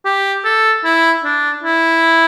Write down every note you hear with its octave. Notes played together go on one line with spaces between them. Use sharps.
G4
A4
E4
D4
E4